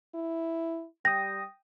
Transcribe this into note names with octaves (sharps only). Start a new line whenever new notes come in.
E4
G3 G5 D#6 A#6